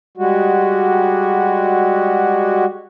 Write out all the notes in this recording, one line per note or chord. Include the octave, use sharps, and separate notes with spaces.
G3 G#3 F#4